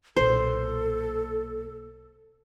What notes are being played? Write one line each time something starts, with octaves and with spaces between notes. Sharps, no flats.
B1 A#2 A4 C5